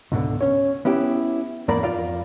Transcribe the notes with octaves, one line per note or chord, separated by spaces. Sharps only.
C#2 G#2 B2 D3
C#4 C#5
B3 C#4 E4 G4
E2 G#2 A#3 A#4 D5 B5
F2 F4 D5 F5